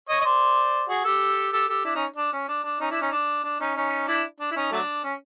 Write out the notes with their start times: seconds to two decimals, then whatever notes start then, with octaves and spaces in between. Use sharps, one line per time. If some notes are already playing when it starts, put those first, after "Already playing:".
0.09 C#5 D#5
0.21 D#5
0.25 C5 D5
0.89 F#4 G#4
1.04 G4 A4
1.52 G4 A4
1.69 G4 A4
1.85 D4 E4
1.95 C#4 D#4
2.17 D4
2.33 C#4
2.48 D4
2.64 D4
2.80 C#4 D#4
2.91 D4 E4
3.02 C#4 D#4
3.12 D4
3.44 D4
3.60 C#4 D#4
3.76 C#4 D#4
4.08 D4 E4
4.40 D4
4.51 E4
4.56 C#4 D#4
4.72 F#3 A3 D4
5.04 C#4